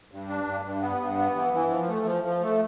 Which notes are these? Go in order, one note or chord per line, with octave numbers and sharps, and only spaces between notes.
G2
D4
G2
G2
B3
G2
B3
E3
E3
F3
A3
F3
F3
A3